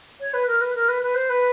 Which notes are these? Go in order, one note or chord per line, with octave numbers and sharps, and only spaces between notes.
C#5
B4
A#4
B4
A#4
B4
B4
C5
B4